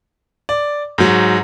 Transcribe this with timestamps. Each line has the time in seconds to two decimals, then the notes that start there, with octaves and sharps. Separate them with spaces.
0.49 D5
0.98 G#2 F#3